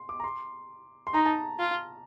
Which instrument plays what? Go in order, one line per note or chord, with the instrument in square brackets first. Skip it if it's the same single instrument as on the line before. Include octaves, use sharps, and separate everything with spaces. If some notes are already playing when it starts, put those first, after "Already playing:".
Already playing: [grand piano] C6
D6
A#5
C6
C6
[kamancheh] D#4 [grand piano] A#5
[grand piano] A5
[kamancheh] F4